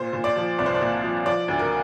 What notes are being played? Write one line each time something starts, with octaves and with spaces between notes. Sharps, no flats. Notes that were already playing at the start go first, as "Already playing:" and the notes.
Already playing: A#2 C5
A#2
D5
F3
C2 D5
C5
D5
A#2
F3
F3 D5
D2
A#4